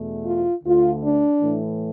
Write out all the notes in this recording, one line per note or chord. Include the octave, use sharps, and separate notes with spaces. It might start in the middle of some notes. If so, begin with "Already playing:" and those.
Already playing: E2 B2 A3
F4
D2 D3 A3 F4
D4
A2 E3 A3